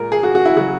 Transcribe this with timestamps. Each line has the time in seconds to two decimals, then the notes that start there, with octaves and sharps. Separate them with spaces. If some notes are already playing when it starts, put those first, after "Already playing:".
Already playing: A#2 G#3 A#4
0.12 G#4
0.23 F#4
0.35 F#4
0.45 E4
0.56 C#3 F#3 F#4